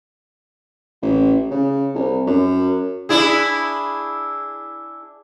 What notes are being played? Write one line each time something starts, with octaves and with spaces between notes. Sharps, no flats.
A1
C#3
C2
F#2
D4 E4 G#4